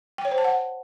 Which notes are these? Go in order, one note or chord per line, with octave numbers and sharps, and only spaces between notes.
G5
C#5
C5
A5
F#5